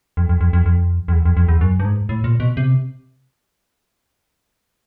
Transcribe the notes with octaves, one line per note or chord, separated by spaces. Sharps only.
F2
F2
F2
F2
F2
F2
E2
F2
F2
E2
F#2
G2
G#2
A2
A#2
B2
C3